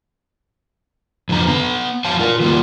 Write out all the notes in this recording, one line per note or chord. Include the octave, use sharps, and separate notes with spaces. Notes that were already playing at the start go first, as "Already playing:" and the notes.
F2 D3 A#5
B3 A#5
F2 C#5 F5 A5
F4 A#4
D#3 F#3 G3 A#3 F4